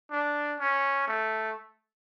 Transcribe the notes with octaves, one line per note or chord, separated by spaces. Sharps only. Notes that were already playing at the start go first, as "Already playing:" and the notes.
D4
C#4
A3